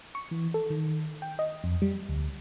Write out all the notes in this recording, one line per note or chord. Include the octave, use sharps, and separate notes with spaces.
C#6
E3
A4
D#3
G5
D#5
F2
G3
D2